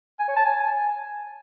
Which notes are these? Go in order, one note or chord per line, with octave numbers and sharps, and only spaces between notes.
G#5
C#5
A5
G#5